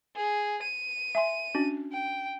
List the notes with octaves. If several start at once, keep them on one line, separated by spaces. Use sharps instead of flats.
G#4
D#7
E5 G#5 C6
C#4 D4 F#4
G5